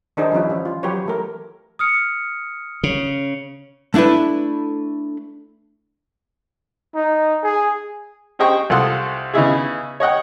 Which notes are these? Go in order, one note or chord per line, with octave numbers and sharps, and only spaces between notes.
D#3 D4 D#4 G#4 C5
F3 G3 C#4 E4
E3 C#4
F4
F#3 G4 B4 C#5
E3 A3 A#4
D#6 F6 C#7
C#3
A3 D4 E4 A4 B4
D#4
G#4
G4 G#4 C5 D#5 G5 C#6
C2 F4 A4 F#5 C6 D#6
C#3 B3 D#4 E4 G#4
C#5 D#5 F#5 G5